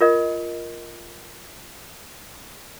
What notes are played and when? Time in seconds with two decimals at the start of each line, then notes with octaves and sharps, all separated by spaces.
0.01 F4 A#4 D#5